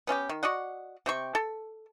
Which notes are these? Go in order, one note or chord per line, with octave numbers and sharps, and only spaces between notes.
B3 C#4 F4 G4
D#3
F#4 D5 D#5 F#5
C3 G5 C#6
A4